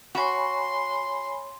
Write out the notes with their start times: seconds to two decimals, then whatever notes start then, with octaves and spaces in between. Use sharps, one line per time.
0.15 F#4 C#5 G#5 B5 C6